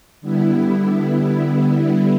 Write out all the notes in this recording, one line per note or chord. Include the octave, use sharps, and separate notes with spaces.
D3 G3 B3 E4